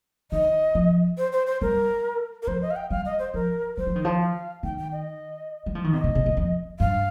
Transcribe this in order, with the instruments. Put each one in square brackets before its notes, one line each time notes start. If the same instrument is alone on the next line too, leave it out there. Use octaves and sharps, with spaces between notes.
[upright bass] D#3 [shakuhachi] D#5
[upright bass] F3
[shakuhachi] C5
C5
C5
[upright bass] G3 [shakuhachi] A#4
[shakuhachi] A#4
[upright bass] F3 [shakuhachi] C5
[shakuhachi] D#5
F5
G5
[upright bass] G3 [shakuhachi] F5
[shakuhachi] D#5
C5
[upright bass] F3 [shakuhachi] A#4
[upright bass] G3 [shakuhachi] C5
[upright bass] F3
D#3
F3
[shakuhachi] F5
[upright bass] D#3 [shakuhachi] G5
[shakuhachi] G5
D#5
[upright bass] G3
F3
D#3
[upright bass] C3 [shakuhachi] D#5
[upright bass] C3
C3
A#2
F2
[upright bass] G2 [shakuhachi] F5